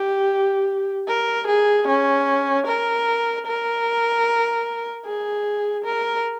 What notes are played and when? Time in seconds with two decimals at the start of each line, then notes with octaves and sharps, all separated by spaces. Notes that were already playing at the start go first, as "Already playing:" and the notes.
Already playing: G4
1.08 A#4
1.47 G#4
1.88 C#4
2.67 A#4
3.47 A#4
5.05 G#4
5.84 A#4